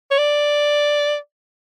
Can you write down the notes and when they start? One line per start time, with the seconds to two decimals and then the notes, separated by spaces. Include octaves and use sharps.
0.11 C#5
0.18 D5